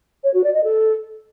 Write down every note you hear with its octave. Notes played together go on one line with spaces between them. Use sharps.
C#5
F#4
D5
D#5
A4